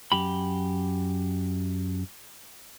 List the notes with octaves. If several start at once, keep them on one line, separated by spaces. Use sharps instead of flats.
F#2 G4 B5